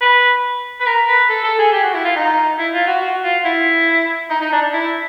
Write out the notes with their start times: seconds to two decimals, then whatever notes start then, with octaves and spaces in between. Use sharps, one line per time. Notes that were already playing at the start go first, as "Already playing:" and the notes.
0.01 B4
0.80 B4
0.87 A#4
1.08 B4
1.29 A4
1.44 A4
1.59 G#4
1.73 G4
1.83 F#4
1.94 E4
2.04 F4
2.16 D#4
2.59 E4
2.73 F4
2.87 F#4
3.01 F#4
3.23 F4
3.45 E4
4.30 D#4
4.41 D#4
4.52 D4
4.73 E4